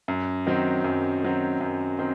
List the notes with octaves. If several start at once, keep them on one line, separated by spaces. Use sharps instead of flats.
F#2
D#3 F#3 C4
F#2
D#3 F#3 C4
F#2
D#3 C4